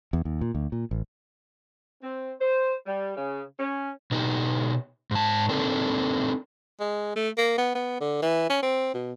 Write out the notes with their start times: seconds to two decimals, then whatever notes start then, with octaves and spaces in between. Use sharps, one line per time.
0.13 E2
0.25 D#2
0.41 A#2
0.55 D2
0.72 A#2
0.91 A1
2.02 C4
2.40 C5
2.87 G3
3.16 C#3
3.59 C#4
4.11 B2 D#4 G4
5.11 G#2 A5
5.49 C4 D4 D#4 A4 A#4
6.80 G#3
7.16 A3
7.37 A#3
7.58 B3
7.75 B3
8.01 D3
8.22 E3
8.50 C#4
8.63 C4
8.94 B2